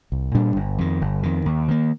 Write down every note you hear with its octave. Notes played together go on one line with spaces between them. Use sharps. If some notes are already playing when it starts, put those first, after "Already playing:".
C2
A#2 G3 D4
G1
F2 D#3
G1
F2 D#3
D#2
D#3 A#3